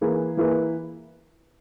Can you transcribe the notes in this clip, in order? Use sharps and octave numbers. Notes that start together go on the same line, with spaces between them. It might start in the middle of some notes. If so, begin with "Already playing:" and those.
E3 A#3 E4 G#4 B4
E3 A#3 E4 G#4 B4